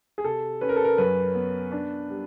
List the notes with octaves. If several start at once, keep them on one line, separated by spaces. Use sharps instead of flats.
G#4
C3 A4
C#4 B4
A#4
A4
A#4
F#2 B4
B3
D4
G3